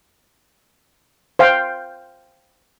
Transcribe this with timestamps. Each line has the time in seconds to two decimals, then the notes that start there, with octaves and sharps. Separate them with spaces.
1.39 C5 F5 G5